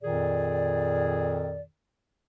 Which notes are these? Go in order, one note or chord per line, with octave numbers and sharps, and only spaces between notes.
F2 A#2 D#3 G#4 D5